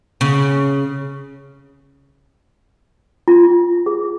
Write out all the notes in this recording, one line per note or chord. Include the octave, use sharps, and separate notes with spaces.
C#3
F4
G#4